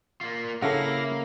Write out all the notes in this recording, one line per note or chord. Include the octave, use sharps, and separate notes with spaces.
A#3 F4
C#3 A#3 E4 A4 F5 F#5 A#6